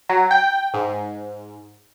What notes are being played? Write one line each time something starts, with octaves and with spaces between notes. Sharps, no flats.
F#3
G5
G#2